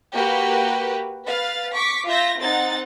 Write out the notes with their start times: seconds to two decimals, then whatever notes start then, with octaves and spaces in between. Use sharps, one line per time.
0.12 A#3 F#4 G4 B4
1.25 B4 F5 A6
1.71 C#6 D6 B6
2.06 F4 E5 G6 A#6
2.39 C4 D#4 F#5 A6